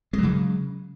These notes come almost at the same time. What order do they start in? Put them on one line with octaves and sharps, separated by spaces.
G#3 F#3 C#3